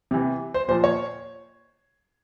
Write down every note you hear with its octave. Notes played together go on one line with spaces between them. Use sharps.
C3 E3
C5
A#2 F3 C5
C#5